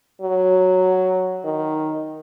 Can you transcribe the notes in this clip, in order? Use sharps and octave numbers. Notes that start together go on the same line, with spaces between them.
F#3
D#3